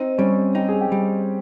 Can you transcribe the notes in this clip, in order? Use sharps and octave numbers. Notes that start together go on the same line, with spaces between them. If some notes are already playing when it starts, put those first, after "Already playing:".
Already playing: C4 D#4
G3 C#4
D#4 G4
G#4
G4
G3